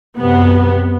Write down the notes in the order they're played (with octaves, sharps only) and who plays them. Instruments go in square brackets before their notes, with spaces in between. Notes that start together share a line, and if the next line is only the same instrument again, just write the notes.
[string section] F#2 C3 B3